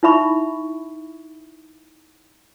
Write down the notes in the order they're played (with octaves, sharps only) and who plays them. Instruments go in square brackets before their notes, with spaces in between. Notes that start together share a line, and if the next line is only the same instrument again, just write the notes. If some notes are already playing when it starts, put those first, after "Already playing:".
[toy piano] D#4 E4 E5 B5 C#6